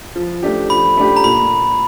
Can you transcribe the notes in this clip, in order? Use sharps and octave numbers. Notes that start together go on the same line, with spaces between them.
F3
A3 D4 G4
F3 B5
A3 D4 G4
A#5
A#2 B5